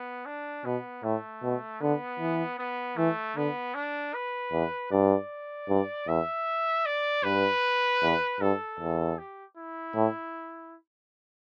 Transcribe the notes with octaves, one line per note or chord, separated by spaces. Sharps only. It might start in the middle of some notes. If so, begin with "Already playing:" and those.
Already playing: B3
D4
B2 B3
A2 A3
B2
D3 B3
E3
B3
E3 A3
D3 B3
D4
B4
E2
G2 D5
G2
E2 E5
D5
G2 B4
E2
G2 A4
E2
G4
E4
A2